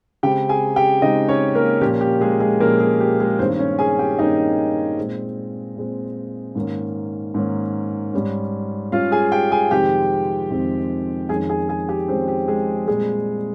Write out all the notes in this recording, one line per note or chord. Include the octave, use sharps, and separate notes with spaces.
C#3 G#3 C4 G4 G5
G#4 G#5
G4 G5
C#3 G#3 C4 D#4 D#5
C#4 C#5
A#3 A#4
A#2 F3 A#3 C#4 G4
G4
G#3 G#4
G#3 G#4
A#2 F3 A#3 C#4 A#4
G#3 G#4
G4
G#3 G#4
G2 D#3 A#3 C4 C#4 C5
C#4 C#5
G#4 G#5
G4 G5
G2 D#3 A#3 C#4 D#4 D#5
A#2 G#3 C4
A#2 G#3 C4
G#2 D#3 A#3 C#4
G#2 D#3 A#3 C#4
G#2 G3 C#4
G#2 G3 C#4 F4 F5
G#4 G#5
G4 G5
G#4 G#5
F2 C3 D#3 G#3 C4 G4 G5
F2 C3 D#3 G#3 C4
F2 D#3 G#3 C#4 G#4 G#5
G#4 G#5
G#4 G#5
G4 G5
F2 D#3 G#3 C4 C#4 C5
G4
G#3 G#4
A#2 G3 G#3 C4 G#4